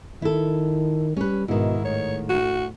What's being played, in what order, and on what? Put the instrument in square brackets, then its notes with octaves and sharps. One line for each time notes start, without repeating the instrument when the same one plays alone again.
[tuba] D#3 [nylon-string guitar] E4 A4
[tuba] G3 [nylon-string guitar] C#4 B4
[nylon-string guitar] G#2 D#3 [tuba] B2 [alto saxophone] E4
[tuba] A2 [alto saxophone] C#5
[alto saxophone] F#4